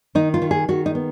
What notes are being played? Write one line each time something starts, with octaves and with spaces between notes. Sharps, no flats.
D#3 D#4
F4
D#3
G#4
D#3 F#4
D#4
B3